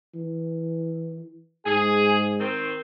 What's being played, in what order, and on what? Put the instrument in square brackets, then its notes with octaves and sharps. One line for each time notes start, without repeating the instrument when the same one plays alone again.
[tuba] E3
[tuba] G#2 [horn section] G#4
[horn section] D#3 C4